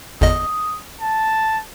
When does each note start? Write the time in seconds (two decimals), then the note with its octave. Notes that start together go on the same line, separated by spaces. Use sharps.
0.21 G1 E2 D#5 D#6
1.01 A5